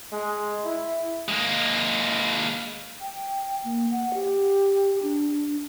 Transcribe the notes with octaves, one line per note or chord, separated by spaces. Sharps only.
G#3
E4
G#3 A#3
G5
A#3
F#5
G4
D4